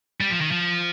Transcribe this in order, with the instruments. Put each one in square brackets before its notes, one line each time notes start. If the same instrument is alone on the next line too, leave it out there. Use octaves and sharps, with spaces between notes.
[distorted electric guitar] G3
F3
D#3
F3